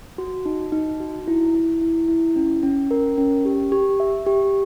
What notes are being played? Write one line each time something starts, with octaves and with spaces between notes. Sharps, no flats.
F#4
D#4
D#4
F#4
E4
E4
E4
E4
C#4
C#4
A#4
C#4
G4
G4
E5
G4